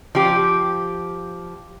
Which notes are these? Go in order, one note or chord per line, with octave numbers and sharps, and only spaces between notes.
F3 G4